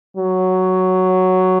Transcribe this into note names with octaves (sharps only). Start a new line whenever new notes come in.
F#3